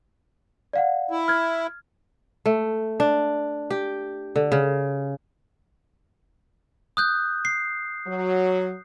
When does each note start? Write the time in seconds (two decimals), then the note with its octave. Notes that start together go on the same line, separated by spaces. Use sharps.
0.73 D5 F5 F#5
1.11 E4
1.28 F6 G#6
2.46 A3
3.00 D4
3.70 G4
4.36 D3
4.52 C#3
6.97 D#6 F#6 G6
7.45 C7
8.07 F#3